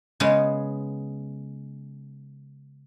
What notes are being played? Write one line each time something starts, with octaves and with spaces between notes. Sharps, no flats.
C#3 G#3 B3